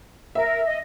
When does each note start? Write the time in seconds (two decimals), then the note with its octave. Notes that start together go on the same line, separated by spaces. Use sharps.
0.35 A#4 E5
0.66 D#5